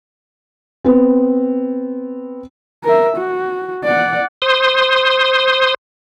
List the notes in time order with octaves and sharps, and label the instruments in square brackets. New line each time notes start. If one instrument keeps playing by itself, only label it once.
[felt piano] B3 C4
[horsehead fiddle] A#4 E5
F#4
D5 F#5
[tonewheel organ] C5 C6 D#6